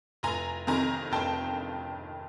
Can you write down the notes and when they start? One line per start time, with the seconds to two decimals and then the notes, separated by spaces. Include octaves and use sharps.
0.23 F1 G#5 A#5
0.67 F2 C3 D#3 G#5 A#5
1.12 F1 G5 A5